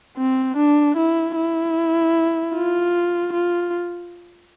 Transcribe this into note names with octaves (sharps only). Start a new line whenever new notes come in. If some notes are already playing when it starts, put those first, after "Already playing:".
C4
D4
E4
E4
F4
F4